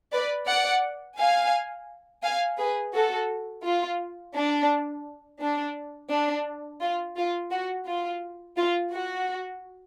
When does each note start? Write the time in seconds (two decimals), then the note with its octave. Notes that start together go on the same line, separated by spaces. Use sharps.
0.12 B4 D5
0.48 D5 F#5
1.18 F5 G#5
2.24 F5 G#5
2.59 G#4 B4
2.94 F#4 A4
3.65 F4
4.35 D4
5.41 D4
6.11 D4
6.81 F4
7.17 F4
7.52 F#4
7.87 F4
8.57 F4
8.93 F#4